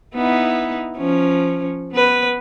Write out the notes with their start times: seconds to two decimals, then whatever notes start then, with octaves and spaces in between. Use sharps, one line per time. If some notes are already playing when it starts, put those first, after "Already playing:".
0.14 B3 D#4 E4
0.97 F3 C#4
1.92 B3 B4